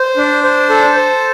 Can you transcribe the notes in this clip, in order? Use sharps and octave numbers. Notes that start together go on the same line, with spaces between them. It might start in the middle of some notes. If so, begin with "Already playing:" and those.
Already playing: C5
D4
C5
A4
C5